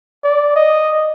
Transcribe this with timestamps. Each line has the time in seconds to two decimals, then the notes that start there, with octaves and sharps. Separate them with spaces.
0.24 D5
0.56 D#5